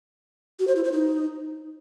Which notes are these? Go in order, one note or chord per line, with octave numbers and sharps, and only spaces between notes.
F#4
C5
E4
C5
D#4